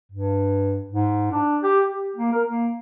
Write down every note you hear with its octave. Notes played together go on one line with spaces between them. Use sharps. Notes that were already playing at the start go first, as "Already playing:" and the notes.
G2
G#2
D4
G4
G4
A#3
A#4
A#3